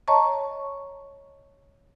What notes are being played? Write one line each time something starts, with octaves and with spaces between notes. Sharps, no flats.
C#5 D#5 A5 A#5 C#6